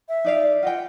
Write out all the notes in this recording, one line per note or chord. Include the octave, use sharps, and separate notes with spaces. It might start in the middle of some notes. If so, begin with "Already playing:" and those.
E5
D#4 D5 F5
F4 D#5 F#5 G5